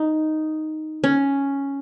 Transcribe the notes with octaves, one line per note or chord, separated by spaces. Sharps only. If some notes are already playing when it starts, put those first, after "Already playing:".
Already playing: D#4
C#4